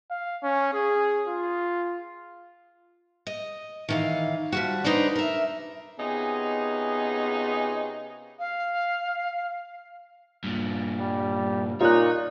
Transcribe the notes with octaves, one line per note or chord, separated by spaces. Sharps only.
F5
C#4
G#4
F4
D#5
D#3 E3 F5
F3 G3 F#4
D4 D#4 B4 C5 D5
A#4 E5
C3 B3 C#4 D#4 F4 G#4
F5
G2 A#2
G3
A#2 D#4 F4 C#5 F#6